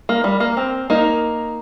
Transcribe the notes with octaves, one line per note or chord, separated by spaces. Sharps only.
A#3
G3
A#3
C4
A#3 D#4